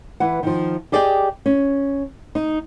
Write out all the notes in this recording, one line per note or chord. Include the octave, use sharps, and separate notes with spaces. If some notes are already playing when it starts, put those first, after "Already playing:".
E3 B4 F#5
D#3 F3
G4 G#4 D5 D#5 F#5 G5
C#4
D#4